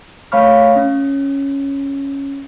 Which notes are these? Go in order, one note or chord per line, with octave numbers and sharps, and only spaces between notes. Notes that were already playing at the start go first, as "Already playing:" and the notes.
A3 C#5 F5 B5 C#6 F6
C#4